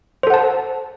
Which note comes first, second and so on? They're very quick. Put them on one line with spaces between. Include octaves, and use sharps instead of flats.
C5 A4 F#5 A5